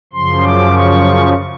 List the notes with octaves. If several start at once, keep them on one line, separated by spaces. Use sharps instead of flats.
F#2 C#3 F3 C6
D6
C#6